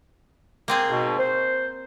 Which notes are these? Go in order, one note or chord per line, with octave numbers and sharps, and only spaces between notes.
A#3 C4 G#4
G#2 B2
C5